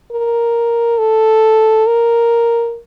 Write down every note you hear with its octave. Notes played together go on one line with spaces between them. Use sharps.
A#4
A4
A#4